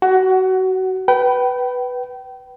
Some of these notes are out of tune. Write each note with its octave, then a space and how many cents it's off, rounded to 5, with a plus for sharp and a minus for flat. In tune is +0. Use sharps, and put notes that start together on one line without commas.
F#4 +25 F#5 +0
B4 +0 G5 -30